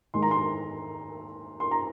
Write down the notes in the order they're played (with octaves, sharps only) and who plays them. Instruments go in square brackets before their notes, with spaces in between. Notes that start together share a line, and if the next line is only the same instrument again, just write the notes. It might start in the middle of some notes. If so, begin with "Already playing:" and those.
[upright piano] G#2 D#3 G#3 C6
A#5
C6
C6
A#5